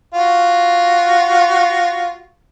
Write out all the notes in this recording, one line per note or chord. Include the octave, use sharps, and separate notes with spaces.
F4 F#4